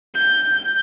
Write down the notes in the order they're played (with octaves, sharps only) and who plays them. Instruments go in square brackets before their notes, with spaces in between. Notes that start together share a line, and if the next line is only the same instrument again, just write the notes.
[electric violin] G6